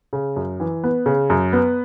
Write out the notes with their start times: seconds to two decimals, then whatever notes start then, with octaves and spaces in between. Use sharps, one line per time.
0.13 C#3
0.36 F#2
0.60 E3
0.84 B3
1.06 C#3
1.30 F#2
1.53 B3